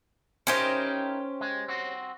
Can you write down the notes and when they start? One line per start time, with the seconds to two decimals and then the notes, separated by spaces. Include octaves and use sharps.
0.47 C#4 D#4 E4 G4 A#4 C5
1.41 G#3
1.68 C4 F#4